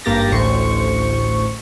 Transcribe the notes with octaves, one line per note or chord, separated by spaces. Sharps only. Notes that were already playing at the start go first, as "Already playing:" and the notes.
G#1 G2 A#3 G4 A6 A#6
A1 D2 A2 C5 C#6